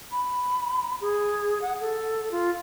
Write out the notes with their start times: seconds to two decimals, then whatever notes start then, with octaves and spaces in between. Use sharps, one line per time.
0.12 B5
1.01 G#4
1.62 F#5
1.81 A4
2.31 F4